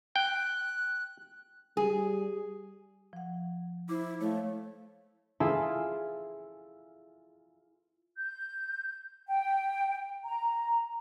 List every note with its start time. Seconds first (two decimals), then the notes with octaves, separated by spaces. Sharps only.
0.16 G5 F#6
1.77 G3 G#4
3.13 F3 F#5
3.89 E4 C5 D6
4.21 A3 C#5 F5
5.40 E4 F4 G#4 A4
8.18 G6
9.28 G5
10.25 A#5